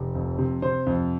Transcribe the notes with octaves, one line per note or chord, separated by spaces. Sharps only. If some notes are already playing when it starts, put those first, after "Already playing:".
Already playing: F1
F2
C3
C3 C5
F2